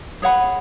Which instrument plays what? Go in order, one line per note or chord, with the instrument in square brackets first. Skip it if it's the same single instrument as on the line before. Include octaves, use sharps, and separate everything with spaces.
[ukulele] G#4 C#5 F#5 B5